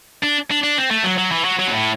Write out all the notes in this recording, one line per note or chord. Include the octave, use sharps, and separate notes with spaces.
D4
D4
D4
C4
A3
F#3
F#3
E3
F#3
F#3
B2
A2